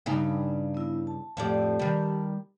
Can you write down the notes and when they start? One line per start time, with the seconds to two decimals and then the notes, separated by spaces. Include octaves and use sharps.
0.06 G2 C#3 D#4
0.74 B3 E4
1.07 A5
1.37 F2 A2 G4 D5 A5
1.79 D#3 G3